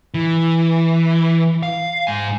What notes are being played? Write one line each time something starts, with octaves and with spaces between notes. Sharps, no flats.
E3
F5
G#2 G#5